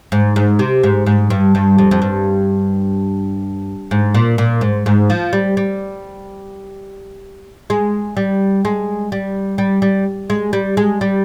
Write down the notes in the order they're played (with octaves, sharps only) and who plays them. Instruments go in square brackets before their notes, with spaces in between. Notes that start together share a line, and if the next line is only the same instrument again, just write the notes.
[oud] G#2
G#2
C3
G#2
G#2
G2
G2
F2
F2
G2
G#2
A#2
A#2
G#2
G#2
F3
G3
G3
G#3
G3
G#3
G3
G3
G3
G#3
G3
G#3
G3